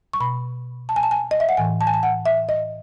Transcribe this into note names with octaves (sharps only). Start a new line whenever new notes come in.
C#6
B2 B5
A5
G#5
A5
G#5
D#5
E5
F#5
A2 E3 G#5
A5
G#5
A5
F#5
E5
D#5